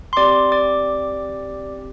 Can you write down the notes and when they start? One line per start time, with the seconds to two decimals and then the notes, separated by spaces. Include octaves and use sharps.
0.13 C6
0.17 C4 G4 D5 D6
0.52 D5 D6